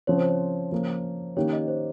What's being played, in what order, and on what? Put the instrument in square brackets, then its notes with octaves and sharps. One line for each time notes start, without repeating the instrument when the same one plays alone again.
[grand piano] C#3 F3 C4 [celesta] C#5
[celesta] C5
C#5
[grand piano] C#3 F3 A#3
[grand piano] D#3 A#3 C#4 G4 [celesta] C#5
[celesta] D#5
C5